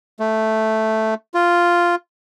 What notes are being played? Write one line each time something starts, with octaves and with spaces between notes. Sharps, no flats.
A3
F4